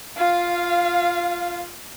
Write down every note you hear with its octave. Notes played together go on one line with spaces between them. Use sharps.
F4 F5